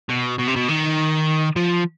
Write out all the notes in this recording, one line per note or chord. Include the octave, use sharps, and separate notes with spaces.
B2
B2
C3
B2
D#3
F3